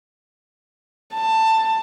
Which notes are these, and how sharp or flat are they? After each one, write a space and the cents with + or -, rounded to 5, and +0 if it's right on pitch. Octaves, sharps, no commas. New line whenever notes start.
A5 +15